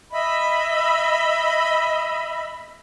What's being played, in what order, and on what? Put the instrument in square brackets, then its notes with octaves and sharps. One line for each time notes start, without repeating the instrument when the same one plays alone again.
[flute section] D#5 E5 B5